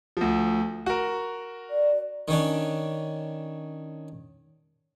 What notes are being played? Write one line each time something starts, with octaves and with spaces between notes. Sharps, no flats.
D2 F3
F#4 A#4
D5
D#3 C#4 D4